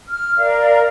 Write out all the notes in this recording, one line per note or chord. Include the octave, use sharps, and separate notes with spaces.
F6
A#4 D5 F5